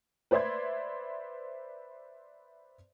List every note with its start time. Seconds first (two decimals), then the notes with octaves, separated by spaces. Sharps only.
0.31 B4 C5 D5 E5 C6 G#6